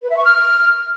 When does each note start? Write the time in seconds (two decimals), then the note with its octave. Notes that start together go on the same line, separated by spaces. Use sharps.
0.02 B4
0.10 E5
0.17 C#6
0.24 F6